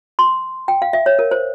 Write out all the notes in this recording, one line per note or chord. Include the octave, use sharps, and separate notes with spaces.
C6
G5
F5
E5
C#5
A#4
C5